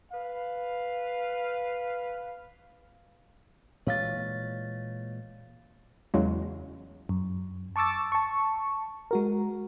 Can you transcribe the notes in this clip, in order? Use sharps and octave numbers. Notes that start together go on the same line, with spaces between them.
B4 F5
A#2 E3 G#3 C#5 F5 A6
E2 C#3 E3 F#3 G#3
F#2
A5 C#6 D6 E6 A6
A5 C#6
G#3 F#4 A#4